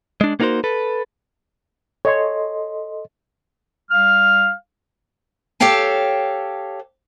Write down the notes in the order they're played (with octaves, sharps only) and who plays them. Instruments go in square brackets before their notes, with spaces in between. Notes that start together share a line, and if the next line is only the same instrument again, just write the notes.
[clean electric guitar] G#3 D4
A#3 B3 D#4 F#4 A#4 C5
A4 B4
[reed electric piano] A4 D#5 C6 [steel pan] C#5
[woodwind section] G3 F5 F6
[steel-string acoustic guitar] G4 A4 C#5 F5 G5 A5